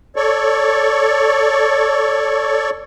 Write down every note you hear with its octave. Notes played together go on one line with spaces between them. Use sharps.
A4 C#5 D5 C#6